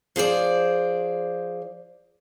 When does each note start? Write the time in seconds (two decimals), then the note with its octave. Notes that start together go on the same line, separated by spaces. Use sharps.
0.16 F3 G#4 C5 D5